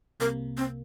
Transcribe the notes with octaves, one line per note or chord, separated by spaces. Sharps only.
C2 C3 A#3 A#4
C4